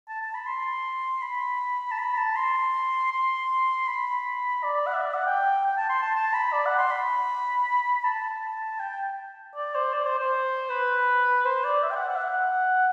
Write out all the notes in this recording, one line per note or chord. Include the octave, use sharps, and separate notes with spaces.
A5
A5
B5
C6
B5
A5
B5
A5
C6
C6
B5
D5
F#5
E5
D5
F#5
G5
G5
A5
C6
A5
A5
B5
D5
F#5
C6
B5
A5
G5
D5
C5
D5
C5
C5
B4
C5
D5
E5
G5
F#5
F#5
E5
F#5